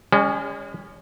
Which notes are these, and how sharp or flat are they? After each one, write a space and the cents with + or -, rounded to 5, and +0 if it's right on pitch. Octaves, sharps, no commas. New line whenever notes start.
G#3 -40 C#4 +20